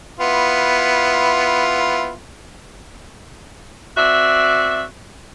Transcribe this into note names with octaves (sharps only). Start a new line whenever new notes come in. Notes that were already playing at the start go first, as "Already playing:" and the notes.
B3 E4 F4
C4 F#4 D5 E5